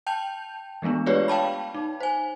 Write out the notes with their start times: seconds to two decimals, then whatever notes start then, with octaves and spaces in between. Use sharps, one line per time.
0.07 G5 A5 G6 F7
0.82 E3 G#3 A3 B3 D4
1.06 F4 G4 G#4 B4 C#5 D5
1.28 F5 G5 A5 B5
1.74 D#4
2.00 C5 G#5